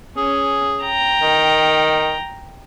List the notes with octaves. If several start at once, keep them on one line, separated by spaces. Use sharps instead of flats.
C#4 G#4
G5 A#5
D#3